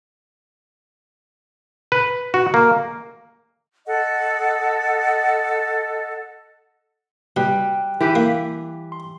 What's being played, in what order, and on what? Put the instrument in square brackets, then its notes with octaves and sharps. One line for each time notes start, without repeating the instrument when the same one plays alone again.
[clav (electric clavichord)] B4
F#4
A#3
[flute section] A4 D#5 F#5
[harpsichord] B2 [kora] G3 [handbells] G5 F#6
[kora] E3 G4 B4
[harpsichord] A#3
[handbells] C6